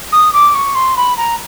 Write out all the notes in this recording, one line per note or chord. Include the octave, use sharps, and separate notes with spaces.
D#6
D6
C#6
C6
B5
A#5